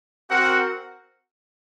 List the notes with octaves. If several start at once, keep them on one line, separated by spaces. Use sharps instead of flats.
C4 F#4 A#4 F#5